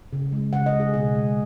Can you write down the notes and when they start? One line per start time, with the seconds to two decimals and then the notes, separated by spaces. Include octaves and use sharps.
0.13 C#3
0.32 G#3
0.53 C#3 F#5
0.66 D#5
0.74 G#3
0.80 G#4
0.94 B2 G#4
1.15 G#3